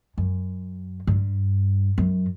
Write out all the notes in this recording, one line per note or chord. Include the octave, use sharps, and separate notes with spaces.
F#2
G2
F#2